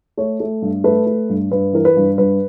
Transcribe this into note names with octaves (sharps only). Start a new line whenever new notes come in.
A3 C#5
A3
G2
A3 B4
A3
G2
G2 B4
E3 A#4
B4
G2
G2 B4